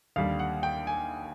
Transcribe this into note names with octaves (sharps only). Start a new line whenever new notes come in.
D#2 D3 G3 F5
F#5
G5
G#5